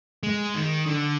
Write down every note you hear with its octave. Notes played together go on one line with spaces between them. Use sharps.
G#3
D#3
D3